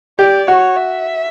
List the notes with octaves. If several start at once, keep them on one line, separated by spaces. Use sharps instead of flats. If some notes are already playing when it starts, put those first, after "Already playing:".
G4 D5
F#4 C#5
E5